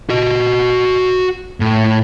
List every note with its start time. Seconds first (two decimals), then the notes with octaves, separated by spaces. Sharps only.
0.10 F#4 D#5
1.60 A2